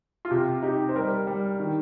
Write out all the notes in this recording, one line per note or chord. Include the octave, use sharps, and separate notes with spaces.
F4
C3 G4
D#4 G4
C5
G3 A#4
G3
D#3